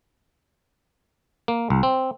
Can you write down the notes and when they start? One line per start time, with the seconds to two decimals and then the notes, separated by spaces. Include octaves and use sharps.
1.48 A#3
1.70 C2
1.83 C4